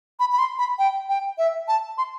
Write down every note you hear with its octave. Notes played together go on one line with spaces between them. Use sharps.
B5
B5
C6
B5
G5
G5
E5
A5
C6